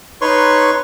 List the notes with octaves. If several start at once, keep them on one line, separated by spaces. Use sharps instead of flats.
D#4 B4 C#5 C6 C#6